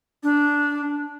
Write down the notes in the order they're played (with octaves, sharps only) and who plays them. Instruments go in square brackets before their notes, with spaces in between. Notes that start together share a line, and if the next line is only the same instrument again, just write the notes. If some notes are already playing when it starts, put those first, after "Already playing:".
[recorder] D4